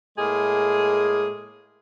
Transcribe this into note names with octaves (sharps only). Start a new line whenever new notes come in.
A2 G#3 A#3 G#4